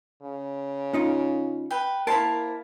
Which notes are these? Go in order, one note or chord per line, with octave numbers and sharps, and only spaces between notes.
C#3
C#4 D#4 F4
B4 G5
A#3 E4 A#4 C5 A5 A#5